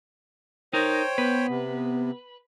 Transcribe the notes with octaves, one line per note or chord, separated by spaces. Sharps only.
D#4 A#4 C5 C#5 G5
B3 B4
C3